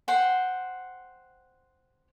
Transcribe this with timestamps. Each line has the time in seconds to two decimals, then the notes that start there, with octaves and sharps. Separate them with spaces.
0.08 C5 F#5 G5